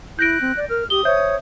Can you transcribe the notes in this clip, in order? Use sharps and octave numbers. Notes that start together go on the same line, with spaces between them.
E4 F#6 G6 A#6 D7
C4
D5
A#4 F6
G4 D#6 G7
C5 C#5 E5 G6